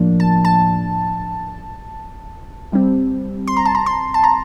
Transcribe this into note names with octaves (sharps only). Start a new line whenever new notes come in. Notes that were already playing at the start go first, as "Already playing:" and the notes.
Already playing: A2 F3 A#3 D4
A5
A5
C3 G3 C4
C6
A#5
A5
A#5
C6
A5
A#5